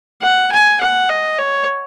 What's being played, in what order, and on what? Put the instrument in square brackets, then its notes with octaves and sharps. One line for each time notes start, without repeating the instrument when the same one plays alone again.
[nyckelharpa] F#5
G#5
F#5
D#5
C#5